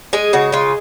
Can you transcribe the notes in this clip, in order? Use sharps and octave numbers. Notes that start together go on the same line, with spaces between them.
G#3 G#4
C#3 F#4
G#3 F4